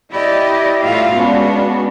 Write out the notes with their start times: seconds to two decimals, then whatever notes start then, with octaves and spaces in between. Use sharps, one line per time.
0.11 E4 G4 D5 D#5
0.84 A2 G3 F4 F#4 E5 F5
1.13 G#3 B3 C#4 D4 F#4